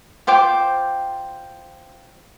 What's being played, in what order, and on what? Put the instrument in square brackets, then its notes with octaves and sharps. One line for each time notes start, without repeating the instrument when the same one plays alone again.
[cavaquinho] F4 C5 G5 D6